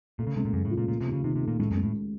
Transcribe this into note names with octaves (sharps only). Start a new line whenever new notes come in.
A#2 A3
C#3
C#2 C3
A#2
F#2 C#3
A2
F3
A#2
A#2 A3
C3
D#2
C#3
C3 D#3
C3
A3
A#2
C#2 A2
F#2
C#2
A2